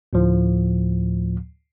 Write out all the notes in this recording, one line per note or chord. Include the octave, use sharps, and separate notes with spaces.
D2 A2 F3